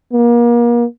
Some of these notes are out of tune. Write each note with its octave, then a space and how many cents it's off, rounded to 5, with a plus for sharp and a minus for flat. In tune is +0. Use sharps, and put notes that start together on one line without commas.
A#3 +35